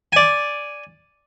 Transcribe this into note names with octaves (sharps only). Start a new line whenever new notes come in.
D5 G#5